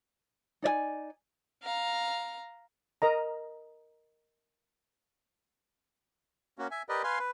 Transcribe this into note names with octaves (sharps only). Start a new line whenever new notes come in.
D#4 D5 D#5 G#5
F5 A#5
A#4 D#5 A#5
A#3 C#4 F#4
E5 G#5
G4 A#4 B4 D5 D#5
B4 F5 G#5 C6
B4